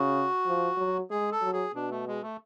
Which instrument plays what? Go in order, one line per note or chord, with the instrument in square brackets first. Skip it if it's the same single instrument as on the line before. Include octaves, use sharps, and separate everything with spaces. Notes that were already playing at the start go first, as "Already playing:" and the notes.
Already playing: [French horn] C#3 [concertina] F#4
[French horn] F3
F#3
[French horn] G#3 [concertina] G#4
[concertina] A4
[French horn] F#3
[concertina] G#4
[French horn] B2 [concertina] D4
[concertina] A3
G#3
A3